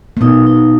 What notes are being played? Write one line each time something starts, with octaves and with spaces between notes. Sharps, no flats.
A#3
B2 B3 D#4
D#4